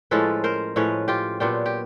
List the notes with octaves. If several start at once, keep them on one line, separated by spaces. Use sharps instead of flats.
A2 F3 G#3 C#4 A4 B4
A#4 C5
A2 F3 G#3 C#4 B4 C#5
F4 G4
A#2 F#3 B3 D4 F4 G4
G4